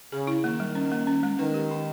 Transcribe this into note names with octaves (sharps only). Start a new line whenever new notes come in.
C#3 G#4
E4
D#3 A#3
G3
C#4
A#3
C#4
G#3
D#3 B4
G4
D#4